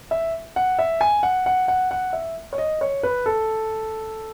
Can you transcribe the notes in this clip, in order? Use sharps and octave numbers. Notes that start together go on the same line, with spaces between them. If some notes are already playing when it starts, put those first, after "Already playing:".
E5
F#5
E5
G#5
F#5
F#5
F#5
F#5
E5
C#5
D#5
C#5
B4
A4